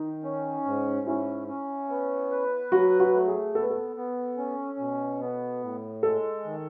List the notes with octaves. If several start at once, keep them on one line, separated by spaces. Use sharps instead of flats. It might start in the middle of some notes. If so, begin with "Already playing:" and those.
Already playing: D#3 D#4
C#4
G#2
C#4 E4
C#4
B3
B4
F#3 F#4
F#4
A3
G#4
B3 A4
B4
A4
B3
C#4
B2
B3
A2
G#3 A4
D#3